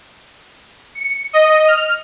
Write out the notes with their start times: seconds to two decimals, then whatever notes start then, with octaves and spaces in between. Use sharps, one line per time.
0.95 C#7
1.33 D#5
1.68 F6